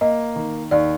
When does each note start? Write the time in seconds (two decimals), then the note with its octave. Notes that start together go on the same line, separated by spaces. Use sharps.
0.01 A#3 D#5
0.36 D#3
0.71 D#2 D5